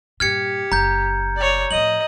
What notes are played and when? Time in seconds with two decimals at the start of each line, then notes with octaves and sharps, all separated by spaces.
0.20 G2 A#2 G4 F6 G#6 C#7
0.72 F#1 A#5 G6
1.36 C#5 D5
1.71 A2 F3 D#5 F#7